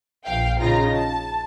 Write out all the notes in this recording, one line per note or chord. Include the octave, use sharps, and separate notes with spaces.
A#1 F5 G5
A#1 C#3 D#4 F4 A#5 A#6
A5